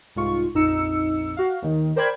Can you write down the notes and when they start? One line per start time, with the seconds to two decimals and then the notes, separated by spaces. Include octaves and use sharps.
0.15 C2 G#2 F4 C#6
0.54 A#1 F2 D#4 E6 C#7
1.37 F#4 F5
1.62 D#2 D#3
1.96 A#4 C5 D5 G5 B5 G#6